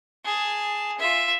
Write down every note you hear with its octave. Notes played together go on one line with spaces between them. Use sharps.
G#4 A5
F4 E5